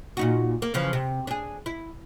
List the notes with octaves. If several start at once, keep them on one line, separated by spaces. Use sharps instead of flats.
A#2 D#4 F#4
A#3
C#3 E3 F3
C3
D4 G#4
E4